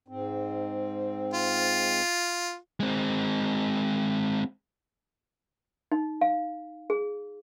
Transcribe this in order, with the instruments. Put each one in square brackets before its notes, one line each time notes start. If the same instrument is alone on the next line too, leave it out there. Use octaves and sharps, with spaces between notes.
[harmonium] G#2 C4
[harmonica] F4
[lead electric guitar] G#3 C4
[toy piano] D#4
F5
G#4